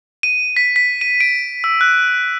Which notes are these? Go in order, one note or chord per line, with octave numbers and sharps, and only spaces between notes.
D#7
B6
B6
D#7
D7
E6
F#6